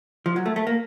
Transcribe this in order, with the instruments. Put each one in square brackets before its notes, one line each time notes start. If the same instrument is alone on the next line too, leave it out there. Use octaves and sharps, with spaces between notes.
[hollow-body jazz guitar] F3
F#3
A3
A3
A#3